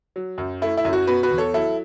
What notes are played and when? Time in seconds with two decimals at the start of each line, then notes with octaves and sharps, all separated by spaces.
0.16 F#3
0.38 F#2
0.62 A3 E4
0.77 E4
0.85 F#2
0.93 F#4
1.07 B2 F#4 B4
1.23 F#4 B4
1.31 E2
1.38 A4 C#5
1.54 F#3 E4 A4